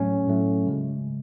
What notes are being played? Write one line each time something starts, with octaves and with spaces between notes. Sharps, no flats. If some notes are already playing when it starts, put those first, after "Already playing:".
Already playing: A2 F#3 A3 C#4
A2 F#3 A3
C#3 G#3